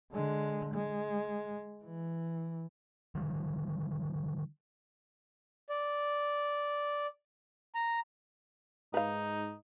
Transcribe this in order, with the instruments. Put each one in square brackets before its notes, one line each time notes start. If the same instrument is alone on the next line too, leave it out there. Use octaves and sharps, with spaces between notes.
[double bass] D3 G#3
G#3
E3
[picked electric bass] D3 D#3 F3 G3
[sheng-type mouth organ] D5
A#5
[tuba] G#2 [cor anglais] D#4 [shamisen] B4 F5